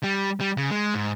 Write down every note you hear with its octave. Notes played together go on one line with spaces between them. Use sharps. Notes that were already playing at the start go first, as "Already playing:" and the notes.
G3
G3
C#3
G#3
G#2